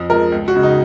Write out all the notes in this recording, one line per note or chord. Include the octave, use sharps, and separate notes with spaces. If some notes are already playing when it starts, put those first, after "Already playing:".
Already playing: F2
F3 G#3 A#4
C#2
F#4
C#3 G#3
D#4